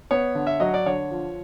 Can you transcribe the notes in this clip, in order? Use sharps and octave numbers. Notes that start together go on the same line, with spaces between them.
B3 C#5
D3
E5
F#3 D#5
D5
D3 C#5
F3